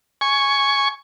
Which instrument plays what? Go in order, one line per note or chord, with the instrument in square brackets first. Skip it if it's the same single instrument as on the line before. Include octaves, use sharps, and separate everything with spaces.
[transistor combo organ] G#5 C#6